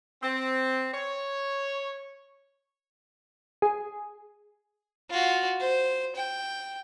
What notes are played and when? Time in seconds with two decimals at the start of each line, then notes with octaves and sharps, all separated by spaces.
0.23 C4
0.94 C#5
3.62 G#4
5.10 F4 F#4
5.60 C5
6.16 G5